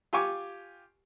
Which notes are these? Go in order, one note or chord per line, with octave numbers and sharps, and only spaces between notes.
F4 G4 G#5 C#6 D6